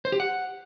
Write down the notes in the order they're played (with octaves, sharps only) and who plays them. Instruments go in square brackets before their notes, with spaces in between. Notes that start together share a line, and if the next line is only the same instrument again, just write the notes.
[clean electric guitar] C5
G4
F#5